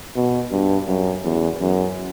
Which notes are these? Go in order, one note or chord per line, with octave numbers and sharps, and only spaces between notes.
B2
G2
F#2
E2
F#2